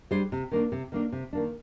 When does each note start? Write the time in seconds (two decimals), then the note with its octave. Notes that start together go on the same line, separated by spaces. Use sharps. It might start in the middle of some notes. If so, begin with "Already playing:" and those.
0.11 G3 D4 G#4 C5
0.32 C3
0.51 D#3 A#3 D4
0.72 C3
0.92 D#3 A#3 D4
1.12 C3
1.33 D#3 A#3 D4